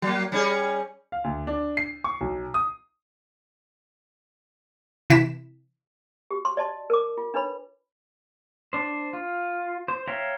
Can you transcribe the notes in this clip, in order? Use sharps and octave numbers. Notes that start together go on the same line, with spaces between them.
F#3 A#3
G3 C#4 G#4
F5
D2
D4
C7
C#6
B1
D#6
C3 E3 E4 B6 E7
F#4 G4
C6
D5 D#5 A5 C6
A#4 D6
F4
D4 D#4 B4 C#5 B5
D4 C5
F4
C5
C#5 E5 F5 G5 A#5